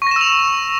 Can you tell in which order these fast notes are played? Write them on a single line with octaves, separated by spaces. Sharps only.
C#6 A#6 E7 E6 F7